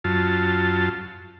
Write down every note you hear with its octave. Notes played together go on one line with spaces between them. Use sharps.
F#2 F4 A5